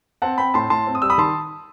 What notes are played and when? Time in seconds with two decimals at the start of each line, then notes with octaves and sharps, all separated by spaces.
0.22 C4 F#5 A5
0.38 C4 G5 B5
0.54 A2 A5 C6
0.70 A2 A5 C6
0.87 C4
0.95 D#6
1.02 G3 E6
1.10 B5 D#6
1.18 D#3 A5 C6